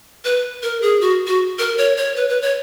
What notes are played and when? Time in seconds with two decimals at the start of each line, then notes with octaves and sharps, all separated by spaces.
0.25 B4
0.63 A#4
0.82 G#4
1.01 F#4
1.27 F#4
1.59 A#4
1.78 C#5
1.97 C#5
2.16 B4
2.29 B4
2.42 C#5